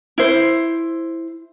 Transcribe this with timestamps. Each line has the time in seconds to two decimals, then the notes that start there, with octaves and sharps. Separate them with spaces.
0.18 E4 C5